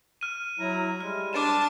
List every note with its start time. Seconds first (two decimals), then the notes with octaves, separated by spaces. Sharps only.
0.21 F6 D#7
0.59 F#3 E4 A#5
1.00 G3 G#3 F6
1.33 D4 A5 D6 A6 E7